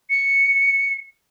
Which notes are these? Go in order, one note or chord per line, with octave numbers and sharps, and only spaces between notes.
C#7